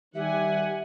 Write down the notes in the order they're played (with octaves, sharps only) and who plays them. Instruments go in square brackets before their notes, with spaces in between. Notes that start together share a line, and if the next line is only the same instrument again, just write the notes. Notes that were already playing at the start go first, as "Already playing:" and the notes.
[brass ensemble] D#3 G3 [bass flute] G4 [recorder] E5 [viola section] F#5 G#5